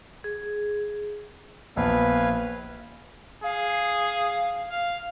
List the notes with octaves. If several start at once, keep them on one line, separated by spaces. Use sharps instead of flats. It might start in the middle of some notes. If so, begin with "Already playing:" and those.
G#4
A#1 B3 B4 F5 G#5
G#4 F5
F5